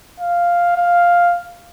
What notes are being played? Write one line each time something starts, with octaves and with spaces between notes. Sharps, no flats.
F5
F5